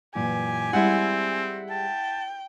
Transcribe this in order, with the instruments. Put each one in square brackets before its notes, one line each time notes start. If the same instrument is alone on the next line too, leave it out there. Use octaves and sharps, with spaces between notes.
[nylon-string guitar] F#2 A#2 E3 [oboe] G4 [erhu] G#5
[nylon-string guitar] G3 G#3 [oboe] C4 [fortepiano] E4 F#5
[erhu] G5 [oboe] A5